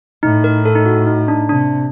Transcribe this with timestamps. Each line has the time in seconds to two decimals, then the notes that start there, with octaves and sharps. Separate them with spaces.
0.23 A2 D#4
0.44 A#4
0.65 A4
0.75 D#4
0.85 F#4
1.07 D#4
1.28 D4
1.49 C3 D4